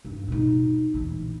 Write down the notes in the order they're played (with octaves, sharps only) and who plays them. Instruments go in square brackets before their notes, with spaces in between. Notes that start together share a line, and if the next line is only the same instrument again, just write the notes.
[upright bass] G2
B2 D#4
A#1 E2